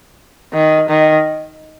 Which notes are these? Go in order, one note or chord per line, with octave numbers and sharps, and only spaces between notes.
D#3
D#3